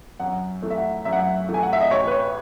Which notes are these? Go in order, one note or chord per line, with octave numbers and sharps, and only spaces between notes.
F#2 F#5
E3 A3
E5
F#5
F#2 E5
F#5
E5
E3 A3
G#5
F#5
E5
D#5
A1 C#5
B4
C#5